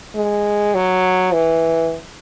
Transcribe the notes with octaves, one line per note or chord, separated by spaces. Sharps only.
G#3
F#3
E3